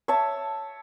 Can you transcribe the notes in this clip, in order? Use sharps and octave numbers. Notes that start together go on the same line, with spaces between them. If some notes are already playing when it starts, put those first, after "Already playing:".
C#5 E5 A5